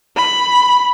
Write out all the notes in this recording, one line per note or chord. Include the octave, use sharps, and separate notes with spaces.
B5